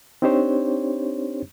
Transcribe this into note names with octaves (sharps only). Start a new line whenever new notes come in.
C4 D4 D#4 G4 C5 C#5